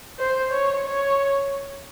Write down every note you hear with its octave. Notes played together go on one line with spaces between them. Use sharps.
C5
C#5
C#5